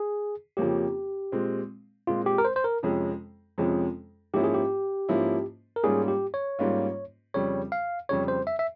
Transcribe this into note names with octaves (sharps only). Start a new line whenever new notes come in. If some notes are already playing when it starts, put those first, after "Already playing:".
Already playing: G#4
F2 C#3 F3 A#3 C#4 G4
A#2 G#3 C4
A#2 G#3 C4 F4
G4
A#4
C5
C5
A#4
F2 C3 F3 G#3 C#4
F2 C3 F3 G#3 C#4
G#2 F3 A#3 C#4 E4 G4
G#4
G4
G#2 F3 A#3 C#4 E4
A#4
G#2 G3 A#3 C#4 F4 G#4
G4
C#5
G#2 G3 A#3 C#4 F4
F2 C#3 G3 C#5
F5
F2 C#3 G3 C#5
C5
E5
E5